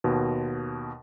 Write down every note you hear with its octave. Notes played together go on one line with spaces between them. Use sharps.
D#2 B2